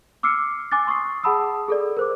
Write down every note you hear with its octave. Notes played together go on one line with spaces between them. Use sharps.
D6 E6 F6 C7 C#7
G#5 D6 F#6 A6
C6 C#6 D#6 C7
G#4 F#5 A5 B5 D#6 E6
G#4 A4 D5
A#4 C5 D6